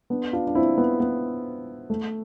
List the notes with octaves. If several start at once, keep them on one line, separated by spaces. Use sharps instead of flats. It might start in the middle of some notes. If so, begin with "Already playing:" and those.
B3 D4
D4 F4
D4
C4 E4
B3
B3
A3